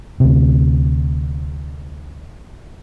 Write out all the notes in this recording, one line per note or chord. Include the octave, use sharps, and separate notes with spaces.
D2 C3